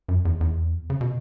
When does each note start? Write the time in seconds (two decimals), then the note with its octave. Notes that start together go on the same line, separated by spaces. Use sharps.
0.08 F#2
0.25 E2
0.41 E2
0.90 C#3
1.01 B2